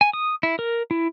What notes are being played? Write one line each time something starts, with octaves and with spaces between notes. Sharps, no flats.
G#5
D#6
E4
A#4
E4